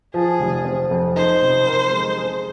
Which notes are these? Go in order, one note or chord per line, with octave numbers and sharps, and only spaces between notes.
F3 G#4
F1
C4
F2
D#4 C5
C3
A#4
G#3
G#4